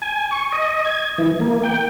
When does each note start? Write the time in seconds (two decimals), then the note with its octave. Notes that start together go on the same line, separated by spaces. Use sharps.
0.02 G#5
0.31 C#6
0.52 D#5
0.85 G#6
1.18 E3
1.40 A#3
1.63 G5